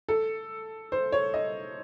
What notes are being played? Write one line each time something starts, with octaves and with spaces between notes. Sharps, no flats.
A4
C5
C#5
D#5